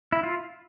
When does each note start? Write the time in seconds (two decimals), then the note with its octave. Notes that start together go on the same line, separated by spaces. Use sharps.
0.12 E4
0.23 F4